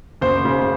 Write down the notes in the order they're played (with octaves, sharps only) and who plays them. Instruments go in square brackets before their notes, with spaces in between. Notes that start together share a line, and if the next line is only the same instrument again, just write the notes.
[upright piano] F#1 [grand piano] C5
[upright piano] C#3